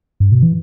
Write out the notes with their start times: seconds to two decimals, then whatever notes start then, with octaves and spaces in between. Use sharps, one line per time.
0.20 G2
0.32 B2
0.43 E3